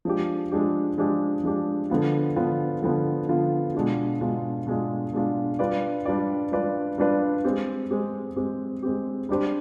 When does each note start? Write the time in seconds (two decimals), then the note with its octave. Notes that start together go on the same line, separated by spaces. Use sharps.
0.05 F3 G#3 D4 G4
0.52 F3 G#3 D4 G4
0.98 F3 G#3 D4 G4
1.44 F3 G#3 D4 G4
1.90 D3 F3 B3 F4
2.36 D3 F3 B3 F4
2.82 D3 F3 B3 F4
3.29 D3 F3 B3 F4
3.75 B2 G#3 D4 F4
4.21 B2 G#3 D4 F4
4.67 B2 G#3 D4 F4
5.13 B2 G#3 D4 F4
5.59 G3 D4 F4 B4 D5
6.05 G3 D4 F4 B4 D5
6.52 G3 D4 F4 B4 D5
6.98 G3 D4 F4 B4 D5
7.44 G#3 C4 G4
7.90 G#3 C4 G4
8.36 G#3 C4 G4
8.83 G#3 C4 G4
9.29 G3 D4 G4 C5